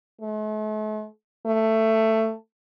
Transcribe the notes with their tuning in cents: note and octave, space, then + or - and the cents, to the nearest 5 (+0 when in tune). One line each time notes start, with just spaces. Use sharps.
A3 -45
A3 +10